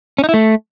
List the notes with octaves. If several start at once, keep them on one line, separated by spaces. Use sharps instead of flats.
C#4
D#4
E4
A3